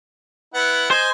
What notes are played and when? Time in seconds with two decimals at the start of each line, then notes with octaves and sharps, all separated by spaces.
0.54 B3 E4 F#5
0.91 C5 D#5 G#5